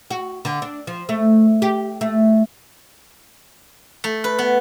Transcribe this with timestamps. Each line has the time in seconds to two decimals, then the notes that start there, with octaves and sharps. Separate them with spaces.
0.10 F#4
0.45 D3
0.62 D4
0.87 F3
1.09 A3
1.62 G4
2.01 A3
4.04 A3
4.24 B4
4.39 B3